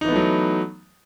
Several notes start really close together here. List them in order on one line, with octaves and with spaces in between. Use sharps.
D#4 E3 B3 A3 F#3